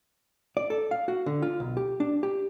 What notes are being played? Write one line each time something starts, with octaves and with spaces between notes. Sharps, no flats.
D5
A4
F5
F#4
D3
F4
B1
G4
D4
G4